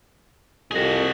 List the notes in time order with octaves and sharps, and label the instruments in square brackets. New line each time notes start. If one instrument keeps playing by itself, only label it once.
[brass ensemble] C2 F2 [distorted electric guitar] F#4 G#4